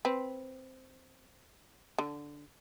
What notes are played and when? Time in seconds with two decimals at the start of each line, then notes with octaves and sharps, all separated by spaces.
0.05 C4 B4
1.98 D3